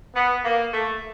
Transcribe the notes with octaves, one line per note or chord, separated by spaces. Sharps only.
B3
A#3
A3